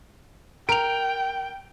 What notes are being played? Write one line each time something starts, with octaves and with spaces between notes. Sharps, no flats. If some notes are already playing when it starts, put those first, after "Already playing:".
A#4 G5 D7 F7